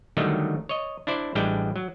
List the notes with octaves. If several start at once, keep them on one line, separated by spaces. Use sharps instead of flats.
D3 D#3 F#3 G3 A3 D#4
C#5 D#5
D4 E4 C5 D5
A1 G3 G#3 D4 E4 G5
F#3